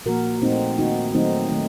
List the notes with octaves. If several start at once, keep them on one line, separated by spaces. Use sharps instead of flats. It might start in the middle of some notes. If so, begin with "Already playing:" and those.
A#2 F3 A#3 F#4 A#4
A#2 A3 C4 D#4
D#3 A#3 D#4 F#4
D#3 F#3 A3 C4 D#4
D#3 A3